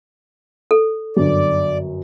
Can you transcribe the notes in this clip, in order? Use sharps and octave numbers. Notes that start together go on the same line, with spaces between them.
A4
G1 F#2 D5